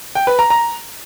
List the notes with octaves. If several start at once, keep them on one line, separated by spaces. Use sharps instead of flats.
G5
B4
A#5
A#5